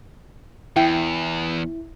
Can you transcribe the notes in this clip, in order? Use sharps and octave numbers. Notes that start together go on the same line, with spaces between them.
E2 E4 G5